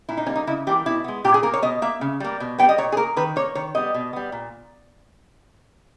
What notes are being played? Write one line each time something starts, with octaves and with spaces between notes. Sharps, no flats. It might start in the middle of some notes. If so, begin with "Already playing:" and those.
A#2 E4
D#4
G3 A#3 C#4
D#4
C#3 E4
E3 G3 A#3 G4
B2 E4
G#3 B3
A#2 G4
G#4
A#3 A#4
C#5
B2 D#5
A#3 E5
C#3
G3 A#3
B2
G3 B3 G5
D#5
A#2 C#5
G#4
A#3 A#4
D#3 B4
A#3 C#5
D#3 C#5
G3 B3 D#5
B2
G3 B3
A#2